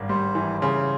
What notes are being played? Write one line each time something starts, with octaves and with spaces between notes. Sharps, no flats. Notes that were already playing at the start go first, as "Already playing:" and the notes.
Already playing: G#1 G2
G3 C5
E3
C#3 C5